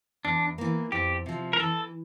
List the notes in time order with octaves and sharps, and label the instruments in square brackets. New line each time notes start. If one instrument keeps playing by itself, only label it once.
[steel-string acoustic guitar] E2 [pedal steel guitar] D4
[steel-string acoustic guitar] E3 A#3
[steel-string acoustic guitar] F2 [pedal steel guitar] G4
[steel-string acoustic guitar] C3 F3
[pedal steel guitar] A#4
[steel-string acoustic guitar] E3 [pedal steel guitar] A4